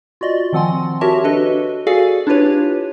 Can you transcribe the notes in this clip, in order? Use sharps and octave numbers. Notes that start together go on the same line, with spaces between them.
F4 F#4 D5 D#5
D#3 F3 C4 F#5 G#5 C6
F#4 G4 A#4 C#5 E5 A5
D4 F#4 A4 B4 D#5
F#4 G#4 A4 D5 F5 G#5
D4 E4 F4 G4 B4 C#5